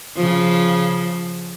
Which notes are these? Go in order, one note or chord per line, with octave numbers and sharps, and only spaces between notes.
C#3 F3